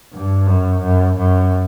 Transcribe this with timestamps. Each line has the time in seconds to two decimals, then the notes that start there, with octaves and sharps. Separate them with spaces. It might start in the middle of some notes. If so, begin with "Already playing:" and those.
0.12 G2
0.47 F#2
0.81 F#2
1.15 F#2